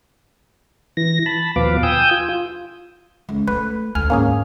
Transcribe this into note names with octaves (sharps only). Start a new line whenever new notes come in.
E3 A#6
A5 B5
D#2 B2 F3 B4 F5 D6
G5 G#5 D#6 E6 G6
F4
C#2
A3 B4
D2 F4 G#5 F6
E2 G#2 A#3 C#4 G#4